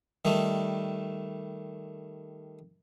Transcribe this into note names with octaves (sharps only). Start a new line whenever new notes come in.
D#3 G3 A3